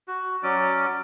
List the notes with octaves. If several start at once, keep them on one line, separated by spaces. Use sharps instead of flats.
F#4
F#3 C#4 D5